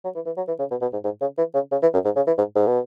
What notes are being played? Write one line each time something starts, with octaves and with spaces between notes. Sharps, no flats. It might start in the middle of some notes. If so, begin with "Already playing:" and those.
F#3
E3
E3
F#3
E3
C#3
B2
B2
G#2
G#2
C#3
E3
C#3
C#3
E3
F#2
G#2
C#3
E3
G#2
G#2
B2